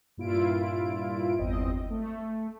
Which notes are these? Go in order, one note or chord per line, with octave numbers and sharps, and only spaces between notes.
G2 A#2 E4 F4 D7
G1 E2 C4 D#5
A3